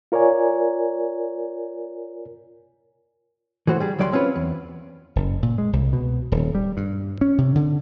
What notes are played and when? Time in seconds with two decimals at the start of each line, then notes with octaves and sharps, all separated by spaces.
0.12 F4 A#4 C#5 D5 G#5
3.67 E3 A3 F#4 C5
3.80 G3 G#4
3.99 D2 F#3 G3 D5 F5 C6
4.12 C4 C#4 F4 B4
4.36 E2
5.16 F#1
5.42 A#2
5.58 G#3
5.73 C2
5.93 B2
6.32 D#1
6.55 G3
6.77 G2
7.21 C#4
7.38 C3
7.55 D3